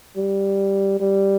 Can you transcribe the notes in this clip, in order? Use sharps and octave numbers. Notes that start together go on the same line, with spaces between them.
G3
G3